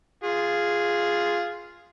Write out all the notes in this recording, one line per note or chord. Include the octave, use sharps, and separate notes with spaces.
F4 G#4